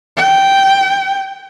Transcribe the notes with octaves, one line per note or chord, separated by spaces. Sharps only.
G5